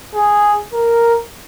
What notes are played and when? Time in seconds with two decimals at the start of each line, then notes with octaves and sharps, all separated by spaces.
0.14 G#4
0.73 A#4